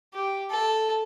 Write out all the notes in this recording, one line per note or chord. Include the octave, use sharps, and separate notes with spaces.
G4
A4